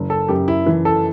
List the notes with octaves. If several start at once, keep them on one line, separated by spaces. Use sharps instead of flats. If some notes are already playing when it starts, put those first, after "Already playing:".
Already playing: F#1
A4
F#2 G4
E4
E3
A4